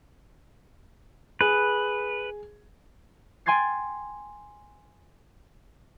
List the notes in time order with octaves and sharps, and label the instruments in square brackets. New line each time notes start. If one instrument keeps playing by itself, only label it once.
[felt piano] G#4 [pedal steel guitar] B4
[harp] G5 G#5 C6 G#6 A6 C7